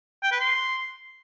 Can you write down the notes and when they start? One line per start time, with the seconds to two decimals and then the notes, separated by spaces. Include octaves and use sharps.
0.23 G5
0.32 B4
0.40 C6